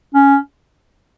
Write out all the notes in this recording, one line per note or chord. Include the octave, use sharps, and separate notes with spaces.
C#4